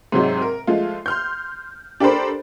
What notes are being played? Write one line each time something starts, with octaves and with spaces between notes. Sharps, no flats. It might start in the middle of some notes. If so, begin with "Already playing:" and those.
G#2 C3 F#3 G#3
A#4
F3 G#3 A3 F4
C6 F6 G6
D4 G4 A4 A#4 C5 B5